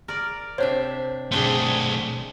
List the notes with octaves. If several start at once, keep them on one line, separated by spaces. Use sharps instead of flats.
A#4 D5
C3 D4 C5 C#5 E5
B1 A3 C4 D4 G#4